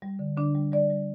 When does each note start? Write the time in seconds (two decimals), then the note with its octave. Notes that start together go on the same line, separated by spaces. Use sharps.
0.02 G3
0.19 D3
0.37 D3 D4
0.55 G3
0.72 G3 D5
0.90 G3